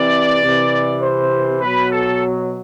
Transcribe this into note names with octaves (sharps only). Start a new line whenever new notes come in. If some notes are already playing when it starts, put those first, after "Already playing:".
Already playing: C3 E3 D5
C3 E3
C5
B2 F#3 B4
A4